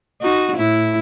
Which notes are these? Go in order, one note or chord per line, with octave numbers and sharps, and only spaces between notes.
D#4 F#4
A2 E4